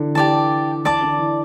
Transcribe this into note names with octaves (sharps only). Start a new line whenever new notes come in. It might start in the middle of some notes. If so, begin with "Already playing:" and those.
Already playing: D3 E3
E3 G4 D5 A5
E3 D5 A5 D6
D3
E3